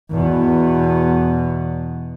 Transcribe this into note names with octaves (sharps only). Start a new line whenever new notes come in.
E2 B2